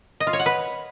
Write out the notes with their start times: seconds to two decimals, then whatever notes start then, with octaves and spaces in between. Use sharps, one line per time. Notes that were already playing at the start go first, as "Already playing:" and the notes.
0.20 D#5
0.27 F4
0.33 C#5
0.40 F#5
0.46 B4